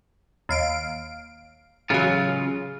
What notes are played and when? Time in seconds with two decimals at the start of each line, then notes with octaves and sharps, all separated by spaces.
0.49 D#2 F5 D7
1.90 A1 C#3 F#3 F4